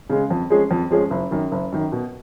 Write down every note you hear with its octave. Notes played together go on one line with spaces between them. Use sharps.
C#3 G#3
F2
F3 G#3 C#4 G#4
F2
F3 G#3 C#4 G#4
F#1
F#2 D#3
F#1
F#2 D#3
B2